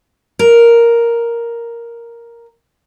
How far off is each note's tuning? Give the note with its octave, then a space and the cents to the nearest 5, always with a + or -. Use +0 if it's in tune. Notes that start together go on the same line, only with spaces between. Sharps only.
A#4 +0